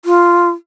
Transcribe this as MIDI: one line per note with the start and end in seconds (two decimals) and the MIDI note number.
0.05 0.50 65